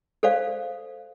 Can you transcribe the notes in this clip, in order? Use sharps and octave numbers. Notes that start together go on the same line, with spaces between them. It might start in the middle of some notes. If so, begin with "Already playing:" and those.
A4 C5 D5 F5